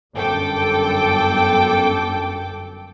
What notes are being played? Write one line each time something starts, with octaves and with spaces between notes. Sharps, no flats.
G1 F#2 A4 G5 D6